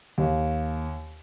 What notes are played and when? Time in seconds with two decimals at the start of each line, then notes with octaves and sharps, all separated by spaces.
0.18 D#2